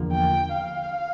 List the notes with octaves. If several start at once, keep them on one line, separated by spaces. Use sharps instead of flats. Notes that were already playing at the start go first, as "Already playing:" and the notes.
Already playing: E2 D3 F3 A#3
G5
F5